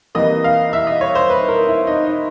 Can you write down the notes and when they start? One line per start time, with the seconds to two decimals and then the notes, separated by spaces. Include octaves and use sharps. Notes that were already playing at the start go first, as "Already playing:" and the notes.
0.15 C2 C3 E3 G3 A#3 D#5
0.44 F5
0.73 E5
0.87 D#5
1.01 C#5
1.15 C5
1.30 B4
1.49 A#4
1.68 E4
1.87 D#4
2.06 D#4